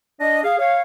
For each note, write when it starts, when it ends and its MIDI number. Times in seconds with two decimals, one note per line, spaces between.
0.20 0.42 62
0.20 0.42 74
0.20 0.42 75
0.43 0.56 68
0.43 0.56 77
0.59 0.80 73
0.59 0.80 77